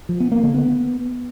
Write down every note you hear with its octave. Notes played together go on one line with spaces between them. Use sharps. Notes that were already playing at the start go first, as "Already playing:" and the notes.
F3
B3
A#3
D3
B3